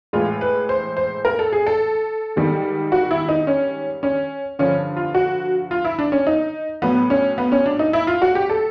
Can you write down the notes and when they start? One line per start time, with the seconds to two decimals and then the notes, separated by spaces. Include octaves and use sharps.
0.13 A2 E3 G#3 F4
0.41 B4
0.69 C5
0.97 C5
1.25 A#4
1.39 A4
1.52 G#4
1.66 A4
2.36 G#2 D#3 G3
2.92 F#4
3.11 E4
3.29 D#4
3.47 C#4
4.03 C#4
4.59 G2 D3 F3 C#4
4.97 F4
5.15 F#4
5.71 F4
5.85 E4
5.99 D4
6.12 C#4
6.27 D#4
6.82 A2 F#3 B3
7.10 C#4
7.38 B3
7.52 C#4
7.66 D4
7.79 D#4
7.93 E4
8.07 F4
8.22 F#4
8.35 G4
8.50 A4